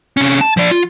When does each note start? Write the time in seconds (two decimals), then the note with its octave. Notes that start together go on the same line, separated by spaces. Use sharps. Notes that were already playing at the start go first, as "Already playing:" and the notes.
0.17 C3 C#4
0.41 A5
0.57 F3 D5
0.71 F4